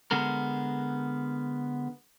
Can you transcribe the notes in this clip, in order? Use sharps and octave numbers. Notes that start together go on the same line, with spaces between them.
D3 G#3 B3 A#4